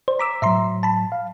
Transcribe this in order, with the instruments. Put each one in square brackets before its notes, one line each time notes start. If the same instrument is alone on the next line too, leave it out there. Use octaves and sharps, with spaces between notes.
[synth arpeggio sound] C5 [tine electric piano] D5
[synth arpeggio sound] A#5 D6 E6 [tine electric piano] B6
[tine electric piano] A2 F#3 [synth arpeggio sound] E5 A#5 C6
[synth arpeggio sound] A5 B5
[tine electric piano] F5